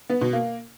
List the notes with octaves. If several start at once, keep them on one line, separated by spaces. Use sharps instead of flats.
B3
B2
A#3